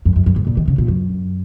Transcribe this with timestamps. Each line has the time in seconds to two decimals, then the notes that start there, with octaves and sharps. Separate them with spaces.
0.05 F#2
0.16 F#2
0.26 F#2
0.36 G#2
0.47 A#2
0.57 D#3
0.68 C#3
0.78 A#2
0.88 F#2